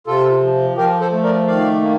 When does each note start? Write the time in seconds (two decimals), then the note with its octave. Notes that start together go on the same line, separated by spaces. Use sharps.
0.07 C3 F4 A4
0.42 F3
0.77 F3 G4 A#4
1.01 A4 C5
1.12 A3
1.24 A#4 D5
1.47 D#3 D5 F5
1.82 A#3